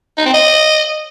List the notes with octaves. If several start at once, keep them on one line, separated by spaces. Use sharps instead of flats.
D#4
C4
D#5